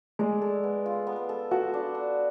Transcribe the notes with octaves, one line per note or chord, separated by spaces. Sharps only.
G#3 D5
A4
B3
F4
B3
A4
F#4 A4
D4
D4